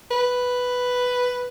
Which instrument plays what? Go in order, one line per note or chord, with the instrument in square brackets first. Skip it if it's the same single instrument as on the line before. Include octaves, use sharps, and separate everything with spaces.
[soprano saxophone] B4